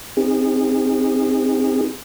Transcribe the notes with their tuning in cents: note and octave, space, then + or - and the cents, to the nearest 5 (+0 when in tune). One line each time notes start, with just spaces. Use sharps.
C4 -10 D#4 +0 G#4 -30